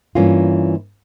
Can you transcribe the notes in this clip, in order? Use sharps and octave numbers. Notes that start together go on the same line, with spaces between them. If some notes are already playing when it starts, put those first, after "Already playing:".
G2 E3 A#3 C#4 F4